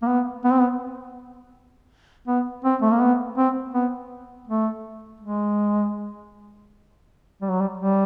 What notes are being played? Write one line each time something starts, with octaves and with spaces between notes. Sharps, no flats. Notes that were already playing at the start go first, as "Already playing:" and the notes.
A#3
B3
B3
C4
B3
B3
C4
A3
A#3
B3
C4
B3
A3
G#3
G3
F#3
G3
G3